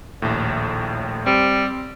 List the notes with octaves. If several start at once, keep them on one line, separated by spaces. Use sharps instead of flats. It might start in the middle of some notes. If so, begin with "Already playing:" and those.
A#1 D#2 A2
G3 C4